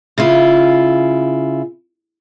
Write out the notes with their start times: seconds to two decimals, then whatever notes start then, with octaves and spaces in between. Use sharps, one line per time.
0.18 C#3 E4 F4